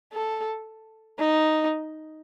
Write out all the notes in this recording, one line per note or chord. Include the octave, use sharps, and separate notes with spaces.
A4
D#4